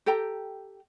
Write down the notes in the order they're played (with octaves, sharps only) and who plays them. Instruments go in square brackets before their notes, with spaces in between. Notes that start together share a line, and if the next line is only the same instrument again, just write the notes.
[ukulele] G4 A4 G5 A#5